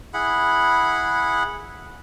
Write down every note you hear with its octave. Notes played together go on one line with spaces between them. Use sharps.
E4 G#4 F#5 B5